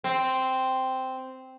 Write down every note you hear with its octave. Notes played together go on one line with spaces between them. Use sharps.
C4